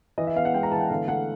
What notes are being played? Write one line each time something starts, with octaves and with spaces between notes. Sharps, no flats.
E3 D#5
E5
B3 F5
F#5
G#3 G5
A#5
E3 A5
G5
D3 F5
A3 F#5